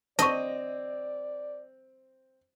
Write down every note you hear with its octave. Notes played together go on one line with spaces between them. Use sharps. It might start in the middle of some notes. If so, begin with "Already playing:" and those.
C4 D5 D#5 A5 C#6